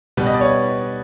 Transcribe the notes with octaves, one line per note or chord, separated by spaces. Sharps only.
B2 G3 B3 B4
D#5
D5
C#5